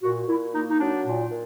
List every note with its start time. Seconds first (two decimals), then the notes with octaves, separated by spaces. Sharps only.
0.02 A#2 F#4
0.28 A#2 E4
0.53 A#3 D#4
0.70 D#4
0.79 F#3 D4
1.05 A#2
1.29 A#2